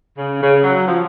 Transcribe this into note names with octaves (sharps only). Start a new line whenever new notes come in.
C#3
C#3
F#3
F3